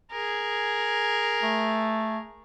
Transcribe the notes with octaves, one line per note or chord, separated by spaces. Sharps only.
G#4 A#4
A3